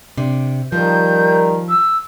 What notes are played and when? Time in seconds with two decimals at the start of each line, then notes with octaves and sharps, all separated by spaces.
0.17 C3 D4
0.72 D#3 F3 G3 A#4 G6
1.69 E6